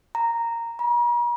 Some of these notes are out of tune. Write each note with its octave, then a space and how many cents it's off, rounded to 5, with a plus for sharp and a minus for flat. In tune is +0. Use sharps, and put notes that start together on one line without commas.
A#5 -10
A#5 +45